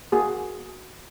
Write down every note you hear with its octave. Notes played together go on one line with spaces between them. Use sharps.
A#3 F#4 G#4